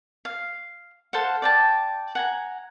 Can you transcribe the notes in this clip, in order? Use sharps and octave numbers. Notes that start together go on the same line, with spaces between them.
F5
A4 C5 F5 F#5
D5 G5 A5
F#5 G#5 A#5